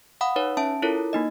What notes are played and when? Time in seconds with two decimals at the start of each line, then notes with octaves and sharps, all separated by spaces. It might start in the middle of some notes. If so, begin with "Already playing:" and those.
0.21 F5 F#5 B5 D#6
0.36 D#4 B4 C#5
0.57 C#4 E5 A5 D7
0.82 E4 F4 A4 A#4 C#5
1.13 A#3 D#4 D#5